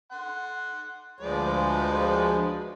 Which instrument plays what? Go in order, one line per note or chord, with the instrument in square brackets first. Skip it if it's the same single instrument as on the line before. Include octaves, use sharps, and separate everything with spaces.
[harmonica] F#5 C6
[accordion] D2 F3 G#3 [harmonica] B4 D5